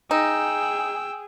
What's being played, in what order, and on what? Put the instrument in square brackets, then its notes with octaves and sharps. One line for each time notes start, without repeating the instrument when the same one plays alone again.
[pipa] D#4 [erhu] G#4 [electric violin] G5 E6